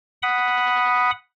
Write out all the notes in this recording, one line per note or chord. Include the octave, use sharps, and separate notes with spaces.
F#5 B5 D#6